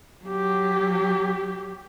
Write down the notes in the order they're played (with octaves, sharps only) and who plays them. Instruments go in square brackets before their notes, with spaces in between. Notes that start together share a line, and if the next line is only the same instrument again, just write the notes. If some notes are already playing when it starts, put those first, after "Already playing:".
[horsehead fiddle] F#3 G4